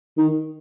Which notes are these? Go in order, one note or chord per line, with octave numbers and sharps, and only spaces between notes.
D#3